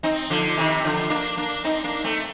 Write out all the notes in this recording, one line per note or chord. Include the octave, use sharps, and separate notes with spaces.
C4 D#4
D3 F3
C3 D#3
D3 F3
A#3 D4
A#3 D4
C4 D#4
A#3 D4
A3 C4